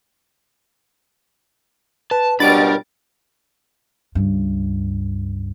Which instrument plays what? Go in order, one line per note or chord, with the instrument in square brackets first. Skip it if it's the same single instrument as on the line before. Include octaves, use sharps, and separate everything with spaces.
[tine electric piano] B4 [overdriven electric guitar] A5
[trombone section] C#2 B2 G3 [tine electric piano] D4 [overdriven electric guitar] A#4 B5 [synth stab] A6 D7
[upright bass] C#2 G2